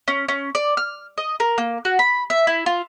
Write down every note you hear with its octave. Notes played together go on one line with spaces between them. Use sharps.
C#4
C#4
D5
F6
D#5
A#4
A#3
F#4
B5
E5
E4
F4